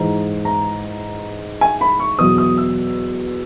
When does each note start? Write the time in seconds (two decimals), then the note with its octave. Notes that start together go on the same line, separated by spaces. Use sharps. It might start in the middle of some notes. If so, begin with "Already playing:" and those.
Already playing: G#2 E3 A#5
0.45 A#5
1.61 G#5
1.81 B5
1.99 C#6
2.19 E2 B2 F#3 D#6
2.38 D#6
2.58 E6